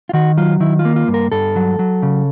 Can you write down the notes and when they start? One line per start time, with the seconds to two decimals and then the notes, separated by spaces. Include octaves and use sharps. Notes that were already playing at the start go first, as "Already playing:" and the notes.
0.09 F4
0.13 D#3 F#4
0.37 F#3 F4
0.60 D#3 E4
0.79 F4
0.85 A#3
0.96 F4
1.08 G2
1.14 A#4
1.32 G2 A4
1.56 F#3
1.79 F#3
2.03 C#3